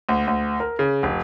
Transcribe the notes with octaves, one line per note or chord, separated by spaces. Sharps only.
D2
D2
A#4
C#3
F1